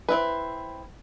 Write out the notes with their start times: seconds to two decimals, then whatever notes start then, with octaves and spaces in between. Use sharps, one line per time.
0.09 C4 E4 B4